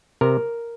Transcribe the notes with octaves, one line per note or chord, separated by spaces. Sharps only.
C3 A#4